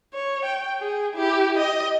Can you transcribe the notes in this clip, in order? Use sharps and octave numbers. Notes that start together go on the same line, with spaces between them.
C#5
G5
G#4
E4 G4
D#5